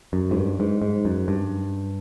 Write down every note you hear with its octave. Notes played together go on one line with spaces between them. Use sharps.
F#2
G#2
G2
G#2
G#2
F#2
G2